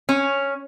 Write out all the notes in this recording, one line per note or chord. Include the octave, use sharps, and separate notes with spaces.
C#4